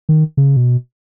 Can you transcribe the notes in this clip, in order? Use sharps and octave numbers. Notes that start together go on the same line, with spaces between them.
D#3
C#3
B2